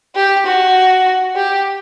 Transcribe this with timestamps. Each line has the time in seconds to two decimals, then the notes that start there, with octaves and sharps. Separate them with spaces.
0.16 G4
0.46 F#4
1.36 G4